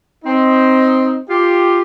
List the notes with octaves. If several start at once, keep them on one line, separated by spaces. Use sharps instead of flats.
C4 D#4
F4 G4